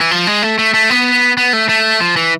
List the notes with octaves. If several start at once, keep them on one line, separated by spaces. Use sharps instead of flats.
E3
F3
G#3
A3
A3
A3
B3
B3
A3
A3
F3
E3